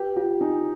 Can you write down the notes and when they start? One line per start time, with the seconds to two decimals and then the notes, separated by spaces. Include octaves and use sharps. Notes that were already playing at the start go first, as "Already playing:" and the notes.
Already playing: G4 B4
0.16 F4 G4
0.41 D#4 G#5